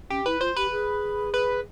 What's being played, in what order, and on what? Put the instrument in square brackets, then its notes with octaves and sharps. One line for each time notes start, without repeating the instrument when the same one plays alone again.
[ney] C#4 [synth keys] G4
[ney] E4 [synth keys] B4
[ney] F4 [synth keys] C5
[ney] G4 [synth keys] B4
[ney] G#4
[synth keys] B4